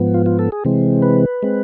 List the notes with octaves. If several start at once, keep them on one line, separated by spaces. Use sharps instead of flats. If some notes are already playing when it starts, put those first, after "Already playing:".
Already playing: G#2 F3 B3
F4
F4
A4
G#4
C3 E3 G#3 C4
B4
G#3 C4